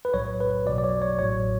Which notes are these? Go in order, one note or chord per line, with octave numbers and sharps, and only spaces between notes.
B4
B1 A2 F#3 C#5
B4
B1 B2 F#3 D5
D5
C#5
C#5
A1 A2 F#3 C#5